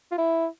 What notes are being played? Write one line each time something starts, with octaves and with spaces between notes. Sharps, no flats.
F4
E4